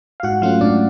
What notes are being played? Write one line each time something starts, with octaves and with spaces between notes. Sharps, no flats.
F5
G#2 F#4 F#5
F#3 A3 C#4 F4 F5
G#2 D4 D5